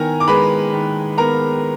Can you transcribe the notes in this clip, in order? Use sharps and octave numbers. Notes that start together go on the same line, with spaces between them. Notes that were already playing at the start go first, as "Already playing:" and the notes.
Already playing: D#3 B3 A#4 G#5 A#5
D6
G#3 B4 B5
D#3
B3 A#4 A#5